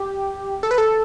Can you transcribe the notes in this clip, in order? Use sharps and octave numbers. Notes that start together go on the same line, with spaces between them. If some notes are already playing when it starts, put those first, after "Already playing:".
Already playing: G4
A4
B4
A4